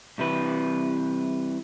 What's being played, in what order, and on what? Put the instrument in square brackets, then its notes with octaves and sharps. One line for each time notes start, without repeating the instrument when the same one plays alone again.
[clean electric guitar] C2 C3 E3 B4